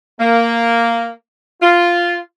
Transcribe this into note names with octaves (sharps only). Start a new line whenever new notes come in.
A#3
F4